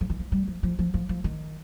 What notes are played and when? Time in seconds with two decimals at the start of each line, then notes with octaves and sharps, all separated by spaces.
0.01 F3
0.10 D#3
0.19 F3
0.32 G3
0.48 F3
0.63 F3
0.79 F3
0.94 F3
1.09 F3
1.24 D#3